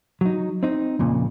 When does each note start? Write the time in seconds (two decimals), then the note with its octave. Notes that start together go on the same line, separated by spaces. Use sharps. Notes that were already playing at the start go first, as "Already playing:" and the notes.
0.21 F#3 D#4
0.63 C4 D#4
0.99 F2 A#2 C#3